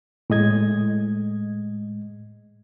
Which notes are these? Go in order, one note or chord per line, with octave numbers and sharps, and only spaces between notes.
A2 G#3 D#5 G#6